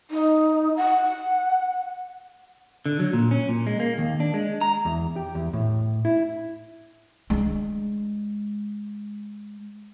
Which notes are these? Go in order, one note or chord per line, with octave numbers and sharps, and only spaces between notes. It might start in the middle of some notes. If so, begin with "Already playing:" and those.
D#4
F#5
D3
F#3
A#2
C#4
A#2
G#3
A#3
D#2
D4
G#3
A#5
E2
G4
E2
A2
E4
G#3 D4